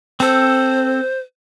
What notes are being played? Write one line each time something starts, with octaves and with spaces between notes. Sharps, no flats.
C4 A4 C5